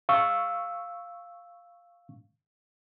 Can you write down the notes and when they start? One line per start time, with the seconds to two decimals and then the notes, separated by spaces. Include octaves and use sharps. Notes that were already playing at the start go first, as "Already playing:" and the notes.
0.09 F5 C#6 E6